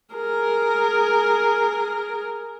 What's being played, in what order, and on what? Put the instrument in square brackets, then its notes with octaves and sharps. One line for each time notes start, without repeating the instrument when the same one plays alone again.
[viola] G#4 A#4